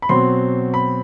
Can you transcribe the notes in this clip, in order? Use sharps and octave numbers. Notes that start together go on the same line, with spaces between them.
B5
B2 F#3 C4 C6
B5